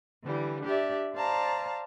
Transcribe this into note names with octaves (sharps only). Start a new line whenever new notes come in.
D3 E3 G3
D4 G4 D5 E5
C5 D5 F5 A5 A#5